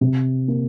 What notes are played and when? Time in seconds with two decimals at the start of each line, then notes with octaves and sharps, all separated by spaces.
0.01 C3
0.48 A#3